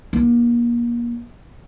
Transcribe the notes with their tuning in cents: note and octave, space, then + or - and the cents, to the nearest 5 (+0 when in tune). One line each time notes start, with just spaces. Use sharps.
A#3 +30 D#4 +0